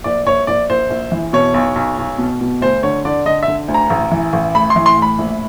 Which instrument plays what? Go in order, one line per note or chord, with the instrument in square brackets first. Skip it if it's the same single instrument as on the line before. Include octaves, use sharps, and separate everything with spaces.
[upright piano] A#1 D5
A#1 C#5
A#1 D5
A#1 C5
A#1
E3
B2 C#5
B1
B1
B1
B2
B2
D2 C5
D3 C#5
D3 D5
D3 D#5
E5
D3
D2
A#5
A1
E3
A1
A2 B5
C6
E3
C6
A2 B5
A#1